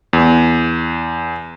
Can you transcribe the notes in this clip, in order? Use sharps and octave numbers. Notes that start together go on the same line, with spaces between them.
E2